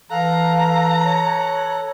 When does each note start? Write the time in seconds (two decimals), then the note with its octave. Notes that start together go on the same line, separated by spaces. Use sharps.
0.11 E3 A4 F5 A#5 F#6
1.04 C#5